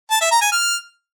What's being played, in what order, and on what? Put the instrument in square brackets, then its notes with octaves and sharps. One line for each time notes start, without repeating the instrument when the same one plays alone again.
[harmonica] A5
E5
A#5
G#5
F6